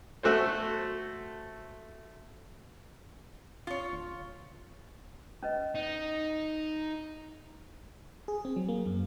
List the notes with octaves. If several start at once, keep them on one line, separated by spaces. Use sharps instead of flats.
A3 F#4 A4 C5
F4 C#5
D1
C#4 B4 D#5
D#4
G#4
C4
F#3
A#3
F#2